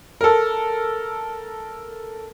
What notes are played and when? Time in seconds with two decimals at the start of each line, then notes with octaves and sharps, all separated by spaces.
0.21 A4 A#4